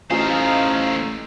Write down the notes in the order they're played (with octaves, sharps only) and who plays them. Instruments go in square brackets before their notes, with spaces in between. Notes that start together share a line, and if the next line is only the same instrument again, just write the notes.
[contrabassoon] A1 [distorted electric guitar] A3 C5 [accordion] D#4 F5 [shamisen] F4 G#4